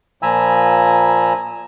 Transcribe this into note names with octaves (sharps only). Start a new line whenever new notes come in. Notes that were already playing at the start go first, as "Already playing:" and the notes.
A#2 F3 G#5 A#5 B5 E6